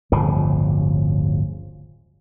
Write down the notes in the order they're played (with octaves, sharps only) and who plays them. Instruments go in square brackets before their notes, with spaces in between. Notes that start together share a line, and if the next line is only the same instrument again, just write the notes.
[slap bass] D1 G1 C#3 F3